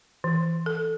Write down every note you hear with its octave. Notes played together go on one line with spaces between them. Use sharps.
E3
A4